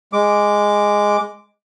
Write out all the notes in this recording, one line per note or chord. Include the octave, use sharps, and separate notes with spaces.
G#3 D6